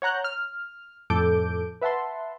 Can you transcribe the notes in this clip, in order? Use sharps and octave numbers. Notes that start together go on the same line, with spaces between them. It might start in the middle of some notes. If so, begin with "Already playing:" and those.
C#5 F#5 A#5 F#6 G6
F6
F2 A2 A4 D6 G6 D7
B4 E5 F#5 A5 C6